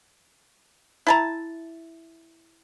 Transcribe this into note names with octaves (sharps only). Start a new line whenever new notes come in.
E4 A5 A#5